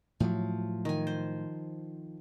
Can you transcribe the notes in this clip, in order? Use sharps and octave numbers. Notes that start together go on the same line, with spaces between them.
A2 F3 F#3
D#3 G#5
C5